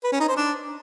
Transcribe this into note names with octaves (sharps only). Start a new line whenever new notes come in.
B4
C#4
D#4
C5
D4